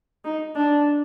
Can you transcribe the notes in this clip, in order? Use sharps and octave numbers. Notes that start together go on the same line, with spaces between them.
D#4
D4